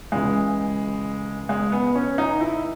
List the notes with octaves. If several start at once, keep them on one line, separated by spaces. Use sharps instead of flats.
C#2 C#3 E3 G#3
G#3
B3
C#4
D#4
E4